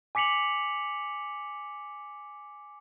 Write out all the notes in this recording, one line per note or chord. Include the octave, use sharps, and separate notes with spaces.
G#5 D6 B6 C#7 F7 F#7